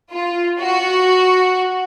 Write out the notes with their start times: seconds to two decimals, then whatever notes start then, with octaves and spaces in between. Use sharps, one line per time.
0.12 F4
0.59 F#4